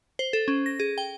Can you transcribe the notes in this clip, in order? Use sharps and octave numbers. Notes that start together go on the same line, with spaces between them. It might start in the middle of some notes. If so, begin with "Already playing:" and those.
C5
A4
C#4
A#6
G#4
G5